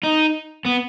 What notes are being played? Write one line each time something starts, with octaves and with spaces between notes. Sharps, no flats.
D#4
B3